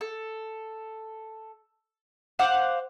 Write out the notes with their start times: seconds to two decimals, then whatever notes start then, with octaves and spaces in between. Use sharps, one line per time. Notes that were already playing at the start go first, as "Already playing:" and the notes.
0.01 A4
2.39 C5 F5 F#5 D6